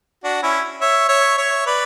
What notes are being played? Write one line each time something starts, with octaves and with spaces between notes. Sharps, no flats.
D4 F#4
C#4 E4
C#5 E5
C#5 E5
C#5 E5
B4 D5